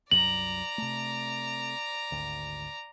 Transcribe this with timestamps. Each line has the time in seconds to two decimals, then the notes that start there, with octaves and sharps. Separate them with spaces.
0.11 C2 F#2 F#3 D5 A#5 F#7
0.78 C3 A3
2.12 G#1 D2